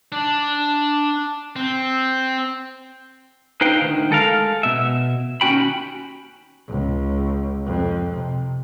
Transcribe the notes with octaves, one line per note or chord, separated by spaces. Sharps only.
D4
C4
D#4 B4 C5 F5 G5
D2 A#2 D#3
G#3 A4 A#4 F5
B2 E5
D#2 C#4 F#4 G5 B5
C#2
F2
C3